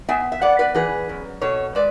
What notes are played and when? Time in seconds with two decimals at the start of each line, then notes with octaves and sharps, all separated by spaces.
0.08 B3 E5 G#5
0.32 E5
0.41 B3 D5 F#5
0.59 B4 D5
0.74 E3 G#4 B4
1.09 F#2
1.41 B2 A4 C#5
1.75 G#3 B4 D5